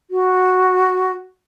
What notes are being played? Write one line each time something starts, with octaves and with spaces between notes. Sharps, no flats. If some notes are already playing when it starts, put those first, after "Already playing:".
F#4